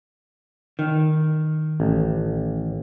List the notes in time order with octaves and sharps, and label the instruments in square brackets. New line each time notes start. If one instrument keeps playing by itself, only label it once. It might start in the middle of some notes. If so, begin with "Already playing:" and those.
[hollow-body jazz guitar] D#3
[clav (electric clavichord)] A1